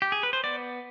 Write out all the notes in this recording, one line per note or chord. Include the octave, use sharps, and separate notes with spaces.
G4
G#4
B4
C5
B3 D5